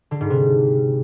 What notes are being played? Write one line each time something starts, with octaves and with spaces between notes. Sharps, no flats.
D3
G#2
C3